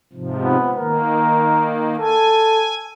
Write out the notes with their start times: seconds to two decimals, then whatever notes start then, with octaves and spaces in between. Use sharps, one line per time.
0.13 G#2 C3 F3
0.44 B3
0.77 D#3 A#3 A#4
1.99 A4 G#5